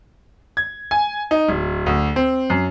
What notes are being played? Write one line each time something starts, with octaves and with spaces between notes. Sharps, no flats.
G#6
G#5
D#4
D1
D2
C4
F#2